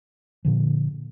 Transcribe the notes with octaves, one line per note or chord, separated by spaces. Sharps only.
A#2 D3 F3